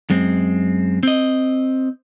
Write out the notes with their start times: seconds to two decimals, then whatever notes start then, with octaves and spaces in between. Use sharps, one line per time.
0.10 F#2 G#3 C4
1.03 C4 D#5